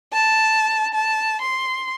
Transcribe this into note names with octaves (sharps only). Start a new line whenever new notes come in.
A5
A5
C6